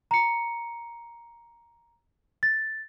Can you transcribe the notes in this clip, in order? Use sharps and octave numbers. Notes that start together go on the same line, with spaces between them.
A#5 C#7
A6